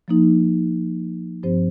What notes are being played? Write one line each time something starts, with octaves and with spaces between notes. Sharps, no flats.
F3 A#3 D#4
G2 F3 C4 G4 C5